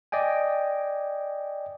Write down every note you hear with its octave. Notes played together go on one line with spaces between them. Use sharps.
D5 D#5 G5 G#5